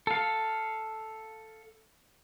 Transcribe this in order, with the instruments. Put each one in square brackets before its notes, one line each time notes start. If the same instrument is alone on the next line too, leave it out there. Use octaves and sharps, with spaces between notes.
[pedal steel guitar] A4 F5